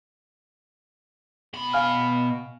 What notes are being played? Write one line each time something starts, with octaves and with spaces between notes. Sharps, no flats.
B2 B5
F5 G#5 F6